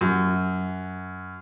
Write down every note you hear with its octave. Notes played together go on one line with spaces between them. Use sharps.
F#2